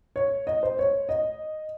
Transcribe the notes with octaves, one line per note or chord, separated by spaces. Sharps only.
C#5
D#5
C5
C#5
D#5